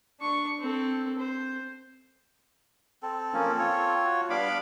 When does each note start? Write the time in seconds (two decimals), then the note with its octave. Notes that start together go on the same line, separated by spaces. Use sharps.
0.20 D4 C#6
0.60 C4 A4
1.19 C5
3.03 C4 A4
3.34 F3 A#3 C#4
3.59 F4 C#5
4.04 F#4
4.30 G3 B3 D4 F5 B5 D6